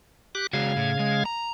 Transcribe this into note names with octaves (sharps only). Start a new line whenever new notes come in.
G4 D6 F#6
C#3 G#3 F#4 F5 G#6
A2
G#3
A#5